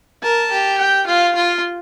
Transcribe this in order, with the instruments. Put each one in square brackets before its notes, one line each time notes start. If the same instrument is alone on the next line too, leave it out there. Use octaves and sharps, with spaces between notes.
[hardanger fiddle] A#4 [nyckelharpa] A5
[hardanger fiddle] G4
[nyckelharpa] G5
[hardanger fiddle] F4 [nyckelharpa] F5
[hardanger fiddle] F4